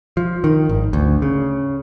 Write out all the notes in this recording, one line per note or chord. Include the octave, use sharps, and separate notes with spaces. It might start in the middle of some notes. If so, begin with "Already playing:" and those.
F3
D#3
G#1
D2
C#3